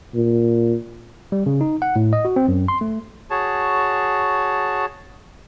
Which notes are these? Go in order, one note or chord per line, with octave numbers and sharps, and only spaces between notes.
A#2
G3
C#3
D#4
F#5
A2
D#5
F#4
C4
F#2
C6
A3
F#4 G#4 C#5 A5